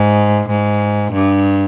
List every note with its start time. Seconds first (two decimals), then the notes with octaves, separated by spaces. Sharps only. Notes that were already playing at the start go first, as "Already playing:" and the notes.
Already playing: G#2
0.49 G#2
1.13 G2